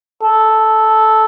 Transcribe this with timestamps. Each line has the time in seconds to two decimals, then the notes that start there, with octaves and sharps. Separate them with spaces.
0.23 A4